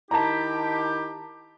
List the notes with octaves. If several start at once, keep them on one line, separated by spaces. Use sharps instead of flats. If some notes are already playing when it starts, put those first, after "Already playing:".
D#3 E4 G4 A5 A#5